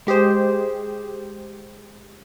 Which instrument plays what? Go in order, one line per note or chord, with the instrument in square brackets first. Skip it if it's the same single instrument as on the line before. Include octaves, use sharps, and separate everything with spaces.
[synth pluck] G#3 G4 G#4 C5